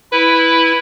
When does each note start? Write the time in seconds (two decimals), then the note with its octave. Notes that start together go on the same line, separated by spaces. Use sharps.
0.12 E4 B4